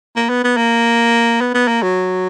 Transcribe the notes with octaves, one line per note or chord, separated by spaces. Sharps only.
A#3
B3
B3
A#3
B3
B3
A#3
F#3